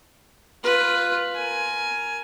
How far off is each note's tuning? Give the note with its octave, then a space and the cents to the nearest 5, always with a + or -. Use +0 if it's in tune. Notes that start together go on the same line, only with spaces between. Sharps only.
F4 +0 B4 +5
A#4 +0 G#5 +15